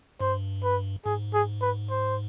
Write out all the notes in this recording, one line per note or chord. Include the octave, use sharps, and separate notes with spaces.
G2 C5
B4
G#2 G#4
G#4
B4
C5